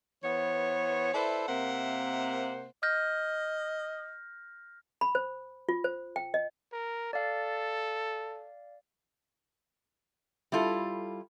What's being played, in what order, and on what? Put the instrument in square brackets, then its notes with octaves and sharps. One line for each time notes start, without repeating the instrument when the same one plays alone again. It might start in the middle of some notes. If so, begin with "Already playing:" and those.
[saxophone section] E3 B3 C5 C#5
E4 A4 B4 C5 D5 E5
C3 A#3 A#4 C5 E5 F#5
[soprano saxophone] D#5 [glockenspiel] F6 G6 A#6
[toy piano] B5
C5
F4
C5
G5
D#5
[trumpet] A#4
[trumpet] A4 [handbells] D5 F5
[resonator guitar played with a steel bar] G3 E4 F4 A4